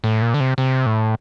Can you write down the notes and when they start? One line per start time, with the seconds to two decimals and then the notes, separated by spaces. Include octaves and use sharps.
0.04 A2
0.22 A#2
0.34 D3
0.40 C3
0.58 C3
0.86 A2